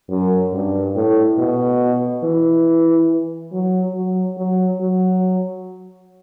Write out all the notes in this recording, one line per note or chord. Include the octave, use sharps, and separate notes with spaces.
F#2
G2
A2
B2
E3
F#3
F#3
F#3
F#3